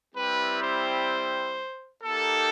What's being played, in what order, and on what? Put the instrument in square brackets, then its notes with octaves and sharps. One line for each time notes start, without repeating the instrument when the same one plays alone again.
[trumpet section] G3 C4 E4 G4 B4
C5
A#3 D#4 G4 A4